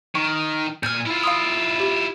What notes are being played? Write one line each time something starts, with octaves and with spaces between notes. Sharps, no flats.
D#3 C#6
A#2 G#5 F6 G6
E4 F4
F5 C6 D#6
G4